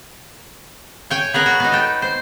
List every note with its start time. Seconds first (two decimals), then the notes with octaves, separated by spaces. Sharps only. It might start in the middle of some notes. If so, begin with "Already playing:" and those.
1.10 C#5 G5 G#5
1.34 B3 G#4 A#4 B4
1.46 F#4
1.60 B3 D#4
1.72 A4 G5
2.02 C5